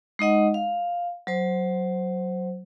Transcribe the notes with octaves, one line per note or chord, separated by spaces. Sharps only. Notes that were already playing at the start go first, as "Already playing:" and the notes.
G#3 D#4 D#5 F#5
F5
F#3 C5